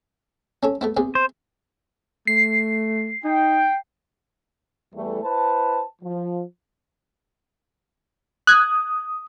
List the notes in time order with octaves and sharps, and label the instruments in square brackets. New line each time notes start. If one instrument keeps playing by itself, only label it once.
[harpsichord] C#4 A4 C#5
A3 B3 E4
C3 B3 G#4
[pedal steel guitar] C5
[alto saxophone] A3 [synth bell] C7
[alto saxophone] D#4 [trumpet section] G5
[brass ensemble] E2 E3 G3 A3
E4 B4 C5 A5
F3
[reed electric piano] D#6 [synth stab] F#6 G#6